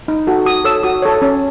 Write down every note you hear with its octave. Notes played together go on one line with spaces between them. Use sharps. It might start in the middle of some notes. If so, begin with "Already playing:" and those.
D#4
F#4 A4
F#4 D#6
A4 C#5 E6
F#4 D#6
A4 C#5
C#4